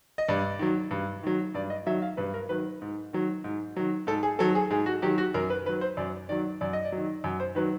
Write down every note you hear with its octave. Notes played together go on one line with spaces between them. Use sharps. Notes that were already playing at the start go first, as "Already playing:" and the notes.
D#5
G2 D5
D#3 F#3
G2
D#3 F#3
G2 D5
D#5
D#3 F#3 E5
F5
G2 B4
A#4
D#3 F#3 B4
G#2
D#3 F#3
G#2
D#3 F#3
G#2 A4
G#4
D#3 F#3 A4
G#4
G#2 G#4
F#4
D#3 F#3 G4
F#4
F#2 A#4
B4
D#3 F#3 B4
C5
F#2 D5
D#3 F#3 D5
F#2 D5
D#5
D5
D#3 F#3
F#2
C5
D#3 F#3 B4